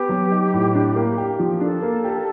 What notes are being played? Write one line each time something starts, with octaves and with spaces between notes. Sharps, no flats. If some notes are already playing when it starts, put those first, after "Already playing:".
Already playing: B3 G4
F#3
D#4
A2
D4
A#3
G4
F3
D4 A4
A#3
G4